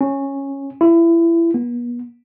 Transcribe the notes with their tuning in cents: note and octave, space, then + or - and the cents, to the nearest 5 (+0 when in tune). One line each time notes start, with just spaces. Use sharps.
C#4 -10
E4 +25
B3 -40